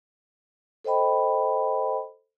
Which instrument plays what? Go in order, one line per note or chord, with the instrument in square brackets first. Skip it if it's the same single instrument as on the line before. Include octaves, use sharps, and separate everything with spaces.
[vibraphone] A4 C5 D#5 G5 B5